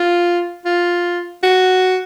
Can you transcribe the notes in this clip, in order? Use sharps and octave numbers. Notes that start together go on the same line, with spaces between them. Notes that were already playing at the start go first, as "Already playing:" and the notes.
Already playing: F4
F4
F#4